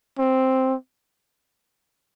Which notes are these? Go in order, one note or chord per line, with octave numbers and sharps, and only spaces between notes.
C4